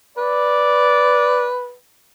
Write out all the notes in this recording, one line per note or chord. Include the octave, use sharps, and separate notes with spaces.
B4 D5